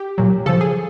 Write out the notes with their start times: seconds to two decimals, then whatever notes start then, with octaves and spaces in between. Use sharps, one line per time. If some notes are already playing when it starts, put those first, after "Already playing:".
Already playing: G4
0.18 A#2 F#3
0.46 C#3 F3 A4
0.61 G#4